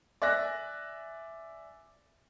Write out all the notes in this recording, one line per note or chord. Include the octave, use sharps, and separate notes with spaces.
D5 E5 G#5 F#6 A#6